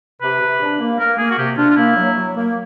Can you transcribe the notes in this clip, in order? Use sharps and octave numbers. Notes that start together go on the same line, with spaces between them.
C3 B4
C3
D4
A#3
A#3 A#4
A#3 G#4
F#4
C3 G4
D4 F4
F4
A#3 E4
F#3
F#3
A#3